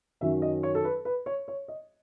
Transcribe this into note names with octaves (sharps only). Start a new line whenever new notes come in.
F#2 D#3 F#3 C#4 E5
D#5
C#5
A4
B4
B4
C#5
C#5
D#5